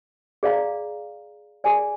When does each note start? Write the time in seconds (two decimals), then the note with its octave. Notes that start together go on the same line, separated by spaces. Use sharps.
0.43 G#4 D5 F5 A#5
1.64 G#4 D5 G#5